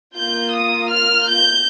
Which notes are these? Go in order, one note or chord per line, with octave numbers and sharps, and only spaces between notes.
A#3 F4 G6
D#6
F6
G6